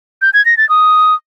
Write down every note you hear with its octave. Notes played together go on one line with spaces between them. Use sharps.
G6
G#6
A#6
A6
D#6